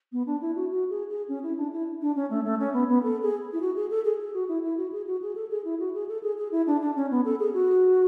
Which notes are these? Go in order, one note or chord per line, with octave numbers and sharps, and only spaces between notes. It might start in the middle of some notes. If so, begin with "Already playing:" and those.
B3
D4
E4
F#4
F#4
G#4
G#4
C#4
E4
D4
E4
D4
C#4
A3
A3
C#4
B3
B3
A4
G#4
E4
F#4
G#4
A4
G#4
G#4
F#4
E4
E4
F#4
G#4
F#4
G#4
A4
G#4
E4
F#4
G#4
A4
G#4
G#4
E4
D4
D4
C#4
B3
A4
G#4
F#4